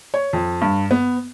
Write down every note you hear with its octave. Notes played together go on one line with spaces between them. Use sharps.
C#5
F2
G2
B3